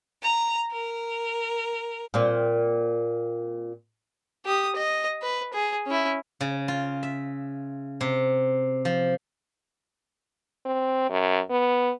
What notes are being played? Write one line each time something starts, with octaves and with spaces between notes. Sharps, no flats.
A#5
A#4
A#2 C4
G4 D#6
D#5
B4
G#4
C#4 E4
C#3
F4
E5
C3
F3
C4
F#2
B3